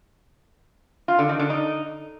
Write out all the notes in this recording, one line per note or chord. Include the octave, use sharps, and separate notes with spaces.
F4
D3
D#3
D3
D#4